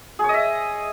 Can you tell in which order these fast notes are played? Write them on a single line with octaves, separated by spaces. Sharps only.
G#4 C#5 D#5 E5